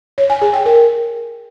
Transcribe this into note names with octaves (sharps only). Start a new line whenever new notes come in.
C#5
G#5
G#4
G5
A#4